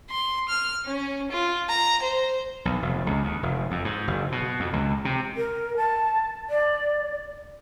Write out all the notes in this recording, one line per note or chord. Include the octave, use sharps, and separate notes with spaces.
C6
F6
C#4
F4
A#5
C5
B1
F1
C#2
D#2
F1
F2
G#2
F#1
B2
F2
C#2
C3
A#4
A5
D5